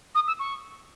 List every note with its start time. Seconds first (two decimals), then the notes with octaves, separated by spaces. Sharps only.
0.15 D#6
0.27 E6
0.39 C#6